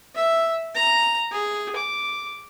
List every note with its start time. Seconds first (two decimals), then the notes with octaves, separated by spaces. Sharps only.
0.15 E5
0.75 A#5
1.32 G#4
1.76 D6